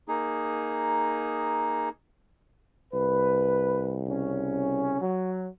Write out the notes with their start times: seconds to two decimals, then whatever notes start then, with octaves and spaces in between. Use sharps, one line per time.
0.08 A#3 D#4 G#4
2.94 C2 B4
4.08 C#3 C#4
5.01 F#3